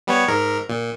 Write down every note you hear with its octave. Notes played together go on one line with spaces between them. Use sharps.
G3 B3 C#5
G#2 A#4
A#2